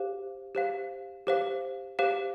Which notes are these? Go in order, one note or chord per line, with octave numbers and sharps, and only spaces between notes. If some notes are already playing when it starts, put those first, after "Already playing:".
Already playing: G4 C5 F5
G4 C5 F5
G4 C5 F5
G4 C5 F5